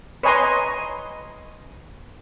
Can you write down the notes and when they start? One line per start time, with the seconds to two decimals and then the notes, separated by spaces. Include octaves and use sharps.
0.23 B4 C#5 D#5 G#5 A#5 C6